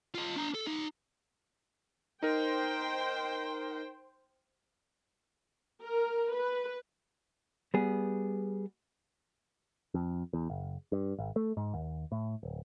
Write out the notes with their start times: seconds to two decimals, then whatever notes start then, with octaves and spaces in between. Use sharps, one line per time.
0.15 F4 D#5
0.36 D4 A#5
0.54 A4
0.67 D#4 E5
2.23 D#4 A#4 C5 G5
5.82 A#4
6.34 B4
7.74 G3 B3 G#4
9.94 F2
10.33 E2
10.50 F#1
10.92 G2
11.19 G#1
11.36 A3
11.57 G#2
11.74 D#2
12.12 A2
12.43 D1